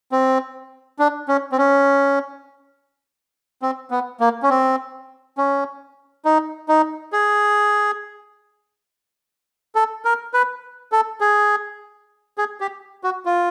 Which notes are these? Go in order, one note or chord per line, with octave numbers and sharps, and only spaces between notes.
C4
D4
C#4
C4
C#4
C4
B3
A#3
C#4
C4
C#4
D#4
D#4
G#4
A4
A#4
B4
A4
G#4
G#4
G4
F#4
F4